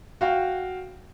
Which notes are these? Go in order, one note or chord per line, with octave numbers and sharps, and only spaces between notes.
F#4 F5 G5